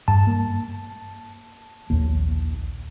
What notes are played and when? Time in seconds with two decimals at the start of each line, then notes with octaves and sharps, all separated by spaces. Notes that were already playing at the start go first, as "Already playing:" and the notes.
0.08 G2 A5
0.27 A#3
1.90 A#1 D#2 A#3